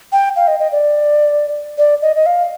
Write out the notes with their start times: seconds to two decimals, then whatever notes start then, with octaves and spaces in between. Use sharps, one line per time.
0.12 G5
0.36 F5
0.48 D#5
0.59 D#5
0.72 D5
1.78 D5
2.02 D#5
2.16 D#5
2.26 F5